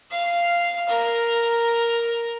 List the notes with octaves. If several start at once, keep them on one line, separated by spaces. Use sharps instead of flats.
F5
A#4